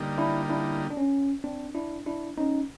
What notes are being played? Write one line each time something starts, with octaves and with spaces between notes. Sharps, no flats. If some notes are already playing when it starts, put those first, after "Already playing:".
Already playing: D3 G3 A#3 D#4
D4 E4
D4 E4
D4
C#4
C4 D4
D4 E4
D4 E4
C#4 D#4